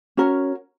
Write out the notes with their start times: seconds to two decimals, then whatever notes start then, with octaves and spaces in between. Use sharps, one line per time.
0.17 C#4 F#4 A#4 C#5